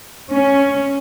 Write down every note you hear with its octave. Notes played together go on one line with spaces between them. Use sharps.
C#4